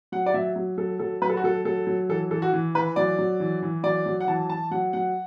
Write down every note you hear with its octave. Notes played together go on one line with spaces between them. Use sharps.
F#3 F#5
D5
F#3 E5
F#3
F#3 A4
F#3 A4
F#3 B4
A4
F#4
F#3 A4
F#3 A4
F#3
E3 A4
E3 A4
F#4
E3
E3 B4
F#3 D5
F#3
E3
E3
F#3 D5
F#3
F#5
E3 A5
E3 A5
F#3 F#5
F#3 F#5